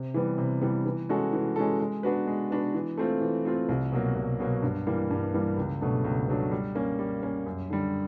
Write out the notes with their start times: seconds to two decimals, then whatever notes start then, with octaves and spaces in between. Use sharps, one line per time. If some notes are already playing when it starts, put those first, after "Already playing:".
Already playing: C3
0.14 E3 G3 B3
0.38 C3
0.61 E3 G3 B3
0.86 E3
1.09 G#3 C#4 F#4 A4
1.33 E3
1.56 G#3 C#4 F#4 A4
1.80 G#3
2.03 B3 D4 F#4 B4
2.27 G#3
2.50 B3 D4 F#4 B4
2.74 E3
2.97 A3 C4 F4
3.21 E3
3.45 A3 C4 F4
3.69 C2
3.92 B2 F#3 A#3
4.16 C2
4.39 B2 F#3 A#3
4.63 G2
4.87 E3 G3 A#3
5.11 G2
5.34 E3 G3 A#3
5.57 C#2
5.81 B2 F#3 A3 D4
6.04 C#2
6.28 B2 F#3 A3 D4
6.52 G3
6.75 A#3 C#4
6.99 G3
7.23 A#3 C#4
7.46 F#2
7.70 D3 G3